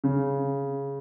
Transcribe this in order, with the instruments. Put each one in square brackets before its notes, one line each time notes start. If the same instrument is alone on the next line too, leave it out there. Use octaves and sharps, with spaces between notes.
[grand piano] C#3